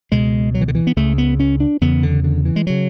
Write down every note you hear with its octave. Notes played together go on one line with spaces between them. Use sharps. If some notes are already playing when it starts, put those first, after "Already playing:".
C#2 B2 G#3
F#3
E3
D3
E3
B3
C#2 C#3 A3
B3
C#4
D4
E2 C#3 B3
D3
D3
E3
G#3
C#3 F#3